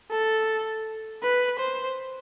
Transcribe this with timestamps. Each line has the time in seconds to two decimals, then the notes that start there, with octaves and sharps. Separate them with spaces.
0.11 A4
1.23 B4
1.59 C5